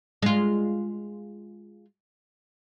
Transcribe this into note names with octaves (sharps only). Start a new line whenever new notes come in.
G#3 F4